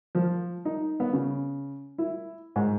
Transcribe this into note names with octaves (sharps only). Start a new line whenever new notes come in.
F3
D#4
B3
C#3
E4
G#2